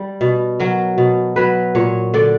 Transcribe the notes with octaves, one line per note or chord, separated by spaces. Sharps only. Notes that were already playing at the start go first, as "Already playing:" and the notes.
Already playing: G3
B2
F#3 A#4
B2
F#3 B4
A#2 C#5
D3 D5